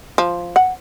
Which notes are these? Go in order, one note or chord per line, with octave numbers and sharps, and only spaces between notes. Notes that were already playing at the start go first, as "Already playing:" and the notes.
F3
F#5